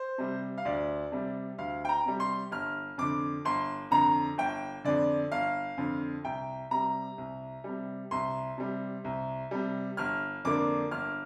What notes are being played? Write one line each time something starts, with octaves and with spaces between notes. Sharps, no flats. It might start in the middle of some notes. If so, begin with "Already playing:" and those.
Already playing: C5
C3 G3
F5
D2 D5
C3 G3
D2 F5
G5
A#5
C3 G3
C6
G1 F6
F2 D3 D6
G1 C6
F2 D3 A#5
G1 G5
F2 D3 D5
G1 F5
F2 D3
C2 G5
C3 G3 A#5
C2
C3 G3
C2 C6
C3 G3
C2
C3 G3
G1 F6
F2 D3 A#3 D4 D6
G1 F6